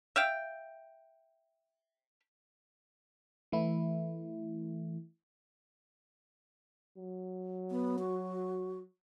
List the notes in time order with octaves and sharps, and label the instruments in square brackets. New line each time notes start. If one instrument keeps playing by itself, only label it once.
[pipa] E5 F5 G5
[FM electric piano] E3 A3 E4
[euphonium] F#3
[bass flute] B3
F#4